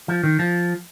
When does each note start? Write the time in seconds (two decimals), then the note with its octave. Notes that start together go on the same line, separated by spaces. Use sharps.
0.08 F3
0.24 D#3
0.39 F3